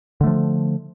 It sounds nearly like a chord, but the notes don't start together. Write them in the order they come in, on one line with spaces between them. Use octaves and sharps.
D3 A3 F3